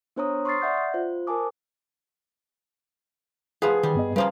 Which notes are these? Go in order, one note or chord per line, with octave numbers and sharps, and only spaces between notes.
B3 D4 C5 C#5 A#5 D#6
C6 C#6 D#6 F6 A6 C7
D5 E5 F#5 G6
F4 C5
A#4 C5 G#5 A5 D6 D#6
F3 B3 G#4
D#3 G3
G2 B3 D#5
C#3 F3 G3 A#3 B4 C5